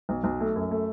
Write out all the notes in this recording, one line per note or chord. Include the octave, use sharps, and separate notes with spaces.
B1
B1
A3
F#2
A3